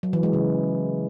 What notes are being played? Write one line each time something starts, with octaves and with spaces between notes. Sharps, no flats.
F#3
E3
G#3
C#3